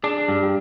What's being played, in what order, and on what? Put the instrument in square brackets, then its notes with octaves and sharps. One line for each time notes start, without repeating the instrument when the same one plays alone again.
[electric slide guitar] D4 [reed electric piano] G#4
[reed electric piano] G#4
[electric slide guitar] G2 [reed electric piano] G4
[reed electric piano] G4